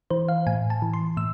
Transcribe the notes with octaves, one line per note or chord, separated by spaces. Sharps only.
E3 C5
F5
A2 G#5
A5
E3
C6
A2 E6